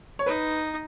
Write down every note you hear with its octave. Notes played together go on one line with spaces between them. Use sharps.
C#5
D#4 B4